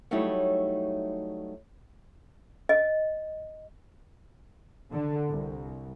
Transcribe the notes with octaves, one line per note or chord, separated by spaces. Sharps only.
F#3 G3 A3 D#4 E4 C#5
D#5
D3
C2